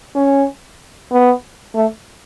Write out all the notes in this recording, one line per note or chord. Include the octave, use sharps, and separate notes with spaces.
C#4
B3
A3